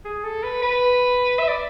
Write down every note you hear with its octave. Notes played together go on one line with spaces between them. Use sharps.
G#4
A4
B4
B4
E5
D5